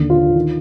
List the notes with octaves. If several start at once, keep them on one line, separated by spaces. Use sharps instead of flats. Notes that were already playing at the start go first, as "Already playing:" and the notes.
Already playing: D#2 D3
F4
D#3